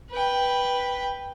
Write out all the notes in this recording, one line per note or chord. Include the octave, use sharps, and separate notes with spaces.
B4 G5